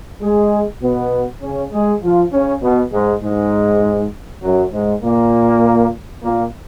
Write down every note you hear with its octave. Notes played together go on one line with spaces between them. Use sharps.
G#3 G#4
B2 B3
C#3 C#4
G#3 G#4
F3 F4
C#3 C#4
B2 B3
G#2 G#3
G#2 G#3
F#2 F#3
G#2 G#3
A#2 A#3
A#2 A#3